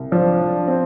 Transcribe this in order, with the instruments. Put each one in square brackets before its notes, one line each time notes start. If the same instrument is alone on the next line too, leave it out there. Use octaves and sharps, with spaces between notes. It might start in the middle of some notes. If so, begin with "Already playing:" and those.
Already playing: [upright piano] C2
[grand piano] F3 [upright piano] D4
[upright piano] D4
C4